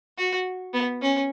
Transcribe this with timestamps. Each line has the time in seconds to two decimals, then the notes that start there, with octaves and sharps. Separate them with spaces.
0.18 F#4
0.74 B3
1.02 C#4